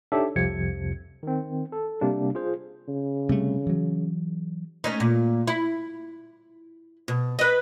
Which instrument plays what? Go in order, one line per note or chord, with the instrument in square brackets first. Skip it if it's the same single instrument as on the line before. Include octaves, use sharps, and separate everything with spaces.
[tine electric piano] D4 D#4 G4 A4 C#5 E5
C2 F2 C3 F3 G#6 C#7
D#3 C4
A4
C3 G3 A#3 D4
F4 G#4 C5
[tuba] C#3
[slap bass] C3 G3 A3
E3 F#3
[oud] A3 C#4 D#4
A#2
E4
B2
B4 D#5